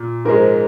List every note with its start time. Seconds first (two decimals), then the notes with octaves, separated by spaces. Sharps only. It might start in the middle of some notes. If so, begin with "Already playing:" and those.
Already playing: A#2
0.25 G#2 F3 G#3 A#4